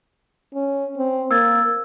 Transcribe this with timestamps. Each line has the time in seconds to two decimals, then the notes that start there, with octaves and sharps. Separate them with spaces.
0.54 C#4
0.98 C4
1.31 A#3 E6 G#6 A6